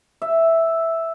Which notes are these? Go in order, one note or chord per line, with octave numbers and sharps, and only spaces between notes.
E5